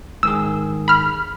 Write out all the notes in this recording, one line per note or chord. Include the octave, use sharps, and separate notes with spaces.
G#2 D#3 G#4 E6
B5 F6